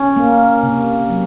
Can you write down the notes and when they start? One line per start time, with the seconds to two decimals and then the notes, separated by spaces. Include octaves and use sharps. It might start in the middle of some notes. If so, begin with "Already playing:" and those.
Already playing: C#4
0.17 A#3
0.63 C3
1.10 F#3